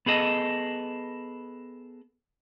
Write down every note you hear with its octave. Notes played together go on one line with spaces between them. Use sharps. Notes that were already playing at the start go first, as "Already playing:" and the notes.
B3 G#4 A4 D#5